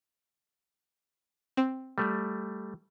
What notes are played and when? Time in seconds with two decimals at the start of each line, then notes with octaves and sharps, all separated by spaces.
1.57 C4
1.98 G3 A3